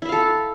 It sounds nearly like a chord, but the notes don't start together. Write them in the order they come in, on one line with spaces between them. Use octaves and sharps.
E4 E5 F5 A4